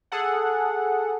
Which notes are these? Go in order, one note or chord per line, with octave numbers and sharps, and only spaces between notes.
G#4 A4 F#5